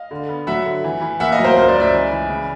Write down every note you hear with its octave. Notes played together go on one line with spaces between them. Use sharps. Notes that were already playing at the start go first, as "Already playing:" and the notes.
Already playing: D#5 F5
D3
B3
F#3 E5 F#5
D3
E3
E3
A#3 E5 F#5
D#5 F5
F#3
A#4 C5
C#2 A#4 C5
C5 D5
C#2
D5 E5
E3
E3
C#3